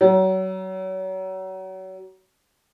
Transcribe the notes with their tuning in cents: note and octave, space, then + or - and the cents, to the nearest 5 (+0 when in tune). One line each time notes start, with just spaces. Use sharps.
F#3 +30